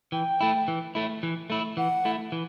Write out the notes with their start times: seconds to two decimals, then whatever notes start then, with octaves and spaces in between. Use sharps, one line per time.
0.12 E3 G5
0.41 A3 E4
0.68 E3
0.95 A3 E4
1.23 E3
1.50 A3 E4
1.77 E3 F#5
2.05 A3 E4
2.32 E3